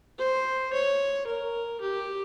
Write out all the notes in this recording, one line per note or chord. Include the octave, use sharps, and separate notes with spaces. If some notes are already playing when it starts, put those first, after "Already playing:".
C5
C#5
A#4
G4